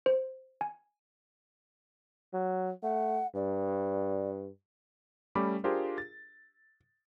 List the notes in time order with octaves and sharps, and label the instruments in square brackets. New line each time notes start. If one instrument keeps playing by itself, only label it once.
[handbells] C5
G#5
[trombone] F#3
[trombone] A3 [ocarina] F#5
[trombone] G2 [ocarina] D5
[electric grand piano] G3 A3 C#4 B5 D6
D4 F4 G4 G#4 A#4 C5
A6